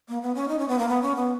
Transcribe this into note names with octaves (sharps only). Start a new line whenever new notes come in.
A#3
B3
C#4
D#4
C#4
B3
A#3
B3
C#4
B3